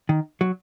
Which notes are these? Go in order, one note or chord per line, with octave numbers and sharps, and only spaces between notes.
D#3
F#3